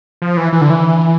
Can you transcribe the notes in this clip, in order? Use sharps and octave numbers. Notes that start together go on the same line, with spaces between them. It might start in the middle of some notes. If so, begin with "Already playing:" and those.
F3
E3
E3
D3
E3